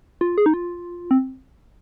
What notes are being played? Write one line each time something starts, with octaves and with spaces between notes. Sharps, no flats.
F4
G#4
D#4
F4
C4